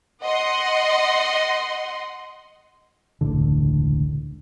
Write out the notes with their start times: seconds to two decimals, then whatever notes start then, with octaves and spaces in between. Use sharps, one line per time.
0.23 D#5 F#5 C6
3.21 E1 C#2 A2 D3